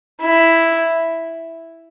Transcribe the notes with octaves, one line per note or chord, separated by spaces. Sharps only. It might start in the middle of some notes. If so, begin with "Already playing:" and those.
E4